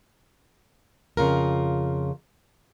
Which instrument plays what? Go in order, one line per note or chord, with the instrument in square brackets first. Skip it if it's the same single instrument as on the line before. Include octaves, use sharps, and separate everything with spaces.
[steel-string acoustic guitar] F2 C#3 F4 A#4